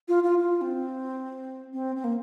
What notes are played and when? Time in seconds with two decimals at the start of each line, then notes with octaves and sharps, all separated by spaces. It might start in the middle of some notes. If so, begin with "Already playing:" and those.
0.08 F4
0.23 F4
0.38 F4
0.61 C4
1.73 C4
1.96 C4
2.04 A#3